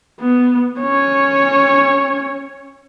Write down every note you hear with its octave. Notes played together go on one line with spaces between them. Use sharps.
B3
C#4 C#5